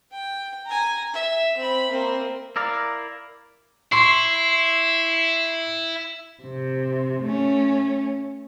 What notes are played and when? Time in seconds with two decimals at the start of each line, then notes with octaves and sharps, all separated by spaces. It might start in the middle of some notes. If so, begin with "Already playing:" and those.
0.12 G5
0.66 G#5 A#5
1.14 E5
1.57 C4 B5
1.91 A#3 C4
2.56 E4 A#4 D5 F5
3.92 E4 C6 C#6 C7
6.43 C3
7.23 A3 C#4